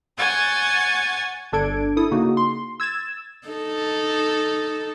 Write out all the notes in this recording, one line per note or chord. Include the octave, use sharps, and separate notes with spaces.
C#5 F#5 G#5 G6 A6
G1 D4 A4 G#6 D7
E4 A4 D#6
C#3 A#3 D#4 F#4
C6
E6 G#6 A6 E7
D#4 A4